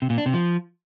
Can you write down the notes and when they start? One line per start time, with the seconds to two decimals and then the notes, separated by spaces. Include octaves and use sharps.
0.02 C3
0.10 A#2
0.18 D4
0.26 C3
0.34 F3